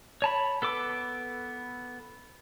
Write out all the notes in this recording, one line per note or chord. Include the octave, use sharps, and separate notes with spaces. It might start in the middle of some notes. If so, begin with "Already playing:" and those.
C#5 A5 B5
B3 A4 B4 D6 E6